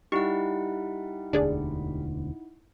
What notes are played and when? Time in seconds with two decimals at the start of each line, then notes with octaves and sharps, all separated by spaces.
0.12 G3 D#4 E4 F#5 C#6
1.33 E1 D2 D3 D4 G#4 D5